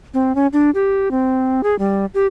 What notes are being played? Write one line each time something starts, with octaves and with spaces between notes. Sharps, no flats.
C4
C#4
D4
G4
C4
G#4
G3
G4